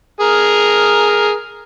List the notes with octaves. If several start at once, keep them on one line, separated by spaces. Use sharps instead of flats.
G#4 A#4